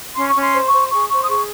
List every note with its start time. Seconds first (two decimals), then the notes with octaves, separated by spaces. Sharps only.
0.16 C#4 C6
0.29 C#6
0.35 C#4
0.41 C6
0.53 C5
0.66 C#6
0.72 C5
0.91 G#4 C#6
1.10 C5 C#6
1.23 D#6
1.28 G#4 C#6